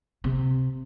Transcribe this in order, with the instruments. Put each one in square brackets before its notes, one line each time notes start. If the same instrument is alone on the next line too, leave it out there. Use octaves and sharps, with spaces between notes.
[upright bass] C3